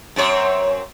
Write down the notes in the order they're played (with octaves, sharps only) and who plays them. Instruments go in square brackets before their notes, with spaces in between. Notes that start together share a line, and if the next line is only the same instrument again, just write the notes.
[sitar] F#2 C4 C#5